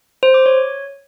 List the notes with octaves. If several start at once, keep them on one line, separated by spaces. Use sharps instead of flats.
C5
D6
C#5